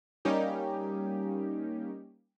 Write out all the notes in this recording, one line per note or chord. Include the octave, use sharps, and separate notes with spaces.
G3 A#3 C#4 D#4 G4